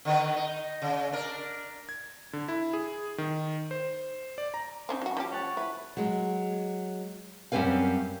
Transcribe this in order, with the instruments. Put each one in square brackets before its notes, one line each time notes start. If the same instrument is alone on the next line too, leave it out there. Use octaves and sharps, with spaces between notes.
[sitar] D3 D#3 B4
D#4
C#3
D4 A#4
[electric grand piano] G#6
D3
E4
G#4
D#3
C5
D5
A#5
[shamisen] C4 C#4 D#4
F#3 F#4
F3 C#4 G4
[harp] C#5 F#5 A5
[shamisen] E4 [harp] B4
[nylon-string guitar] F#3 G#3
F#2 G3 C4 C#4 B4 F5